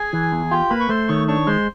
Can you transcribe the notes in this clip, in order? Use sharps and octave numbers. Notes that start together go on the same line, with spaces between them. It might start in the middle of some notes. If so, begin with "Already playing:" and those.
Already playing: G#4 G#5
E3
E2
F4 G4 G5
A#3 B4 B5
C#6
A3 C5 C6
D#3 C#5 C#6
D4 C#5 C#6
G#3 C5 C6